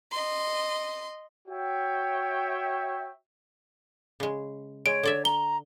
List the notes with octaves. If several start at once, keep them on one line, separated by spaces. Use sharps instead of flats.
D#5 C6
F#4 C#5 E5 G5
C#3 G#3
G#3 C#5 D7
D3 D5 E5
A#5 G7